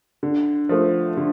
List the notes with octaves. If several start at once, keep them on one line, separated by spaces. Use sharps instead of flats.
D3
F3 A3
D3